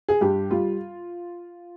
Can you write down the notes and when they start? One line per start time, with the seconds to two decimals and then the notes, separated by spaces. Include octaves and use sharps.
0.09 G#4
0.21 G2 G4
0.51 G3 F4